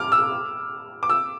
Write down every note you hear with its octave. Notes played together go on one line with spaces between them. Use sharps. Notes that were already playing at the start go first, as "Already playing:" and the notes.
Already playing: D6 F6
E6
D6
E6